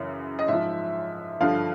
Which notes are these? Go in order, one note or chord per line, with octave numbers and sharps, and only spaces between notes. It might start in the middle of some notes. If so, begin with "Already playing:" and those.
Already playing: F#2 C#3 E3
D#5
G#2 F3 E5
G2 D3 F3 F5